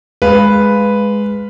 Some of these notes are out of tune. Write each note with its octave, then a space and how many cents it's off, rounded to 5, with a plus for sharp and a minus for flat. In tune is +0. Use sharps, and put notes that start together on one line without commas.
G#3 +0 B4 +0 F5 +0